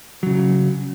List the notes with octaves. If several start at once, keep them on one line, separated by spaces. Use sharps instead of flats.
C#3 F#3